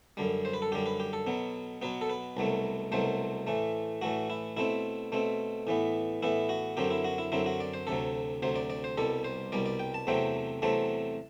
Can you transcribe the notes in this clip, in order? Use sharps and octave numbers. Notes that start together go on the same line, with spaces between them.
F#2 D3 G3
C5
B4
A4
F#2 D3 G3 G4
B4
G4
A4
B2 F#3 B3
B2 F#3 B3 B4
A4
B4
C2 B2 F#3 A3
C2 B2 F#3 A3 C5
A2 E3 A3
A2 E3 A3 F#4
E4
B2 A3 C4 E4
B2 A3 C4
A2 E3 B3
A2 E3 B3 E4
F#4
F#2 D3 F#3 C4 G4
E4
F#4
E4
F#2 D3 F#3 C4 E4
F#4
D5
C5
D2 C3 F#3 A4
D2 C3 F#3 C5
D5
D5
C5
C2 B2 G3 A4
C5
C2 B2 G3 D5
D5
G5
A5
E2 C3 F#3 A3 C4 G5
E2 C3 F#3 A3 C4 A5